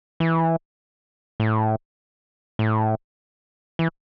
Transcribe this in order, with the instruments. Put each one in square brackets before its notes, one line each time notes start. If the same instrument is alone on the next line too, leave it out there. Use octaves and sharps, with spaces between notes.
[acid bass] E3
A2
A2
E3